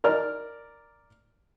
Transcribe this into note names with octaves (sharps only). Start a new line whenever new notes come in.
A#4 D5 F6